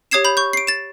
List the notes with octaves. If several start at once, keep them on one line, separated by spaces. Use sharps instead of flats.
G4 C#5 D#6 G#6 C7 E7
B5 G6 F7
C#6 G6
C7 D7
A6 E7